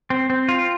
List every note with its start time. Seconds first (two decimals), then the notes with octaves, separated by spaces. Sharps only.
0.10 C4
0.30 C4
0.49 F4